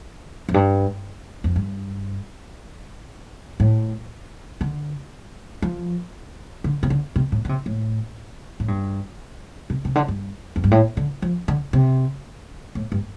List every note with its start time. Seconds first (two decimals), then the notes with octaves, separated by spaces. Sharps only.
0.49 F2
0.54 G2
1.44 F2
1.56 G2
3.60 A2
4.61 D3
5.62 F3
6.64 D3
6.83 C3
6.90 D3
7.16 C3
7.32 A2
7.45 D3
7.49 C3
7.66 A2
8.60 A2
8.68 G2
9.70 C3
9.85 C3
9.95 D3
10.08 G2
10.56 F2
10.64 G2
10.71 A2
10.97 D3
11.22 F3
11.48 D3
11.73 C3
12.75 A2
12.92 G2